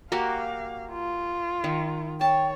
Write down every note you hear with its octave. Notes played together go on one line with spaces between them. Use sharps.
A#3 F#4 G4 F5
F4
D#3
C#5 G5 A5